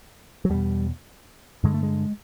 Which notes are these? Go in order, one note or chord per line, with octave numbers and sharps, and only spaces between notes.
F#3
E2 B2 G3
G2 D3 G#3
A3
G#3